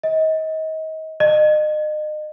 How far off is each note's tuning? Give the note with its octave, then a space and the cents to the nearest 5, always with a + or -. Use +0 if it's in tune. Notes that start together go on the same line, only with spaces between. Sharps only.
D#5 +30
D#5 -35